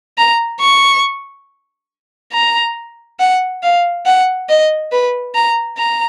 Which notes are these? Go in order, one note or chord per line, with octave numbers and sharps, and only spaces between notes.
A#5
C#6
A#5
F#5
F5
F#5
D#5
B4
A#5
A#5